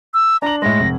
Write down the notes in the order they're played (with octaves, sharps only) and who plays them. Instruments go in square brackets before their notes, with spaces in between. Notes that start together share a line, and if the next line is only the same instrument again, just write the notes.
[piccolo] E6
[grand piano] D4 F#7 [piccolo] A#5
[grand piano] A2 G#3 [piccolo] A#6
[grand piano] F1